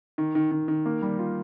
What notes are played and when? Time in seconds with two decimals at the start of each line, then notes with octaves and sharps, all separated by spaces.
0.18 D#3
0.35 D#3
0.51 D#3
0.68 D#3
0.86 A#3
1.02 G3
1.19 F4